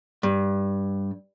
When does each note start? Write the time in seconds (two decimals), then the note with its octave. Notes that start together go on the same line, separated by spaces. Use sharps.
0.23 G2